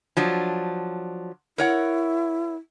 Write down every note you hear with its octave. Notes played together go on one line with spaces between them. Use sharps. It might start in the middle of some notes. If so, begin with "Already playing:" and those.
F3 F#3 D4
E4 A#4 C#5 F#5